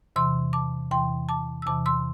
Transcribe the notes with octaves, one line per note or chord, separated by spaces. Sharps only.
E2 C3 E3 C6 E6
A5 D6
E2 C3 E3 G5 C6
A5 D6
E6
E2 C3 E3 A5 D6
C6 E6